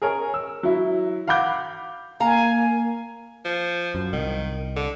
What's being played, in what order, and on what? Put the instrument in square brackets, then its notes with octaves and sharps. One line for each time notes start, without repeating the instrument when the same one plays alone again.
[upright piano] G#4 A#4 C#5 G#5
E6
F#3 E4
F5 F#5 B5 D6 G6
[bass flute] A#3 [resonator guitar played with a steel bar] F5 A#5 [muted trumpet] G#5
[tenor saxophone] F3
[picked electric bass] F#2
[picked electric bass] C2 [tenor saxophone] D#3
[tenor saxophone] D3